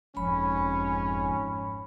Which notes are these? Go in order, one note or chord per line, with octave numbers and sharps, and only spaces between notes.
F#1 F2 G#2 C#4 B5